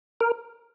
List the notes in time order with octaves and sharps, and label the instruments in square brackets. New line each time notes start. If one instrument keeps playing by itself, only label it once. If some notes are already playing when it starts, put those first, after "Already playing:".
[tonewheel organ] A#4